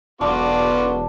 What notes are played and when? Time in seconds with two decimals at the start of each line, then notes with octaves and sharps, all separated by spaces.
0.21 E1 B1 B3 D4 F4 F#4 D6